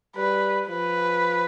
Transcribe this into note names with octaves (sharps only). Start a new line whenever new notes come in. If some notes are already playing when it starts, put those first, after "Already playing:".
G3 B4
F3 B4